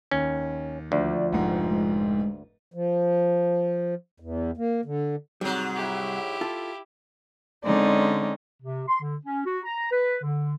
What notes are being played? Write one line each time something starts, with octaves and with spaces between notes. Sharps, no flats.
D#2 C#4
D2 F3 D5
F1 G#2 F#5
G#3
F3
E2
A#3
D3
G#2 C3 F#3 G3
E4 G4
F4 A4
D3 G#3 C4 C#4 D#4 D5
C3
C6
D3
C#4
F#4
A#5
B4
D3